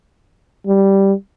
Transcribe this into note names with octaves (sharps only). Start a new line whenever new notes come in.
G3